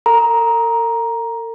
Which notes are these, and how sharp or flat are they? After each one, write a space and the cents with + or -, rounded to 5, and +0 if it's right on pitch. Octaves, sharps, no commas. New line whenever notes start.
A#4 -45 A#5 +10